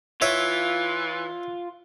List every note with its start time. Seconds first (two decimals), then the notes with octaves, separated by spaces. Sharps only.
0.22 E3 F4 C#5 E5